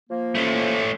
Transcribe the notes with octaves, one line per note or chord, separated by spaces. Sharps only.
F3 A#3
A3 C#4